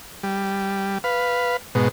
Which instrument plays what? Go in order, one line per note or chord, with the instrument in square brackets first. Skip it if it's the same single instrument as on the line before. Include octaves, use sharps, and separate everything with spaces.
[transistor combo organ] G3
B4 F5
G#2 B2